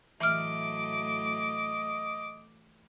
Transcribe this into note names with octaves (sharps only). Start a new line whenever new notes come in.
A2 E3 F#3 A3 D#5 D6 F6